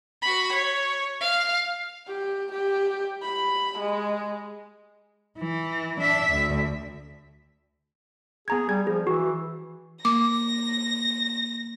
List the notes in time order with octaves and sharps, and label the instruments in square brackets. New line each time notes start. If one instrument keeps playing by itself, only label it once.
[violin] F#4 B5
C#5
F5
[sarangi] G4
G4
B5
G#3
[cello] E3
D4 E5
D2
[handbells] B3 A#5 G#6 [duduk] G#4
[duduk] G3 [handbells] G#6
[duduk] F3 [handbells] G#4
[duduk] E3 [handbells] F#4
[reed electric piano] A#3 [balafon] D6 [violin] A#6